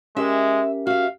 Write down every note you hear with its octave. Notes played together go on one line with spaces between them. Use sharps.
G#3 C#4 G4 A#4 E5
F#4 E5 F5